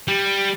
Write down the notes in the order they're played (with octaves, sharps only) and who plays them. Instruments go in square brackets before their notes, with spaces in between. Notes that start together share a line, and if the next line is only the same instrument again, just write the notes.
[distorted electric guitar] G3